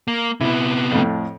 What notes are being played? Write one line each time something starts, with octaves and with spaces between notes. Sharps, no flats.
A#3
C3 B3 E4
F2 A2